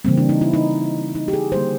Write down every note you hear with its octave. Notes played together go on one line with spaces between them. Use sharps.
C#3 E3 G3 A#3 C4
D4
D#4
E4
D#4
D#4
G4
G#4
D3 G3 A#3 C5